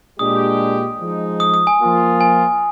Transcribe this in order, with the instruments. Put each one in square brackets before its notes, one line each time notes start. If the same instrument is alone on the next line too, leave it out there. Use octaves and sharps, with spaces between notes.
[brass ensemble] A#2 G#3 D4 G4 [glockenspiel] D#6
[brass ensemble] F3 G#3 D#4
[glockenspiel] D#6
D#6
G#5
[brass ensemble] F3 A#3 F4
[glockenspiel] G#5